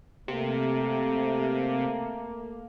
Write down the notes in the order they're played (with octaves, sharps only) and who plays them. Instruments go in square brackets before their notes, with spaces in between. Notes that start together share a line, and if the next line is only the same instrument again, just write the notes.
[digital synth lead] C3 [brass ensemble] A3 A#3